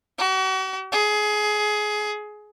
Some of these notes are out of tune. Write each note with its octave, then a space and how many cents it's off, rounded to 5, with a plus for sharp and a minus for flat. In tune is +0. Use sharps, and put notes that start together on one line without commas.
F#4 +40
G#4 +20